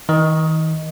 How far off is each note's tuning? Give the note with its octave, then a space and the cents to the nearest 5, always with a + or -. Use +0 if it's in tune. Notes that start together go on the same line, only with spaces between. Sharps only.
D#3 +45 D#5 +0